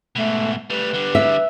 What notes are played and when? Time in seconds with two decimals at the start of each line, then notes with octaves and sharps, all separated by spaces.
0.16 G#2 B2 A3
0.70 G3 A3 B4
0.94 D3 G3
1.15 E5